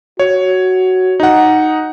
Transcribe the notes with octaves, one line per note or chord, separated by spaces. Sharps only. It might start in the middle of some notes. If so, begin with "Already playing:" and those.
F#4 C#5
D#4 F#5